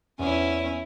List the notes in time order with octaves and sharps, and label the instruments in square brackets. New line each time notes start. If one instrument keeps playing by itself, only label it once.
[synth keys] E2 [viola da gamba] C#4 E4